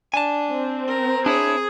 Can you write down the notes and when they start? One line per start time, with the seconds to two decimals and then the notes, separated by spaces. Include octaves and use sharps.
0.14 D4 G#5 A5
0.52 C4
0.88 A#4
1.26 D4 E4 G#4 C#5